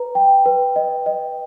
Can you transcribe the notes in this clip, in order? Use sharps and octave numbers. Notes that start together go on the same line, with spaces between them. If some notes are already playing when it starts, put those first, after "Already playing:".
Already playing: B4 A#5
G5
B4
D#5
D#5